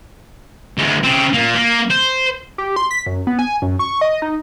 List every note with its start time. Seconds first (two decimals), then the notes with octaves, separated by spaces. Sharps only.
0.77 D2 G#3
1.03 C#3 C4
1.33 A#2 A#3
1.55 A#3
1.90 C5
2.58 G4
2.76 C6
2.91 B6
3.06 F#2
3.27 B3
3.39 G#5
3.62 F#2
3.79 C#6
4.01 D#5
4.22 D#4